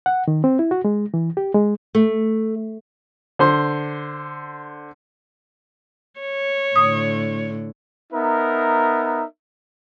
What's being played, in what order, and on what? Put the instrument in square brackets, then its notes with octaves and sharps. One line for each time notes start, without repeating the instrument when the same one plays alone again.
[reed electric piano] F#5
D#3
C4
E4
F#4
G#3
E3
G4
G#3
[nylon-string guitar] A3
[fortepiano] D3 C5 C6
[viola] C#5
[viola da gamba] A2 D3 [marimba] D#6
[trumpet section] B3 D#4 A#4 E5